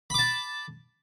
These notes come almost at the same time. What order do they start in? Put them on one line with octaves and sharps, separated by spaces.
B5 D6 A5